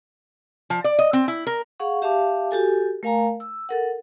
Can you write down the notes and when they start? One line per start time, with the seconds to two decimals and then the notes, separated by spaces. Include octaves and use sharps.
0.70 F3
0.84 D5
0.99 D#5
1.13 C4
1.28 E4
1.47 A#4
1.80 G#4 F5 F#5 C#6
2.02 G4 E5 F5 A5 D6
2.51 F#4 G4 A4 G#5
3.03 A3 A#4 F5 G#5 A#5
3.40 E6
3.69 A4 A#4 F#5